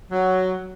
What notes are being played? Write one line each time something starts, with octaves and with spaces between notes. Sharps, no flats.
F#3